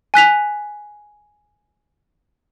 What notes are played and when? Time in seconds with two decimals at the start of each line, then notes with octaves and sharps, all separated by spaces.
0.14 G#5 F#6 B6 F7